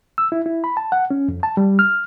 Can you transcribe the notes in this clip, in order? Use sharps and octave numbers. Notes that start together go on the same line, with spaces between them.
E6
E4
E4
B5
A5
F#5
C#4
F2
A5
G3
F6